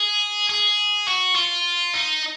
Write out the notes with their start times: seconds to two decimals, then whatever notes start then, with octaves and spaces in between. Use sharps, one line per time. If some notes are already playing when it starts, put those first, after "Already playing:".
Already playing: G#4
0.50 G#4
1.08 F#4
1.36 F4
1.93 D#4